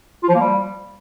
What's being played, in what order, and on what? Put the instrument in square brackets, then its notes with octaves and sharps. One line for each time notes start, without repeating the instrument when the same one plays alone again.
[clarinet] F4
F3
A#3
G3